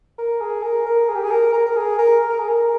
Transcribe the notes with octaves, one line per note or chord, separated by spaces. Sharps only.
A#4
G#4
A#4
A#4
G#4
G4
G#4
A#4
A#4
A#4
G#4
A#4
A#4
G#4
A#4